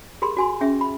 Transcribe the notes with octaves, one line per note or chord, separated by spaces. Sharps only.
G4 G#4 A#4 B5 C6
F#4 G#5 C6
C#4 G#4 E5
B5